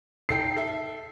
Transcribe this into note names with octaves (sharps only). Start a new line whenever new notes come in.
D#4 A4 G5 C7
A4 E5